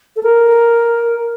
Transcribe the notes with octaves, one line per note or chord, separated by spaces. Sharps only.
A4
A#4